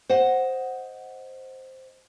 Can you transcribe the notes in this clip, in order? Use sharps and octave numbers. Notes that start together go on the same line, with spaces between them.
C5 D#5 F#5